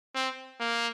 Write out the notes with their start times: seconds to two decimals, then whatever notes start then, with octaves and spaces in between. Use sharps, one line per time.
0.15 C4
0.60 A#3